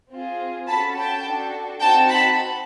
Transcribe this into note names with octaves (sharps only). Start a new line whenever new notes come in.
C4 F4 G#4
C#4 F#4 A4 A5 B5
G5 A5
D4 F#4 A4
C4 D#4 F#4 G5 A5
A5 B5